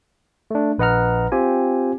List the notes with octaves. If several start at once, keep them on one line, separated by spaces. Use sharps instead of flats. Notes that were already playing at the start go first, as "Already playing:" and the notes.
A3 D4
A#1 B4 D#5 F#5 A#5 F6
C4 F4 G4 G#5